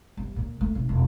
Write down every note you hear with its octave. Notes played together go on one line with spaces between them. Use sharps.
G1
A#2
A3
B1
E1